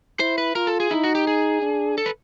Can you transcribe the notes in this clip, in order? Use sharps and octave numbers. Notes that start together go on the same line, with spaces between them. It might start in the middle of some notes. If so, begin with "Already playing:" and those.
E4 C5
B4
F4 A#4
A4
G#4
D#4 E4
F#4
G4
G#4
D4
A4
B4